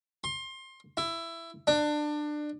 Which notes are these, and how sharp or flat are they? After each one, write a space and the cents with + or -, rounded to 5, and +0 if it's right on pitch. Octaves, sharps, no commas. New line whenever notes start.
C6 +25
E4 +15
D4 +25